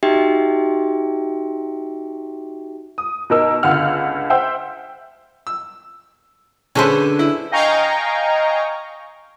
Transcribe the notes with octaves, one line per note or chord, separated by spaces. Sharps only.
D#4 F#4 G4 E5 G5
D#6
B2 D#4 A#4 E6
C#2 D3 F#5 F6
C5 E5 F#5 G5 E6
E6
D3 C#4 G#4 A4 B4 C5
E4
D#5 F5 G5 G#5 A#5 C#6